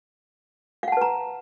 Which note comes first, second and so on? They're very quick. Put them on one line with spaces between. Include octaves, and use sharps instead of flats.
F5 F#5 A5 B4 A#5